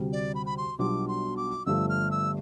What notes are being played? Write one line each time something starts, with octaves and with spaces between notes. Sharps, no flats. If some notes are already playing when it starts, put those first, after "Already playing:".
Already playing: D2 C3 G3
D5
B5
B5
C6
B1 B2 G3 D4 F4 D6
C6
D6
G1 G2 F3 A3 E6
F6
E6